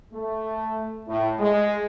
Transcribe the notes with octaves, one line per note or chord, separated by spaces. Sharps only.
A3
A2
G#3